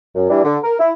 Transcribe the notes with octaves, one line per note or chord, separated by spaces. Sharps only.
F#2
E3 G3 D4
D3
A#4
E4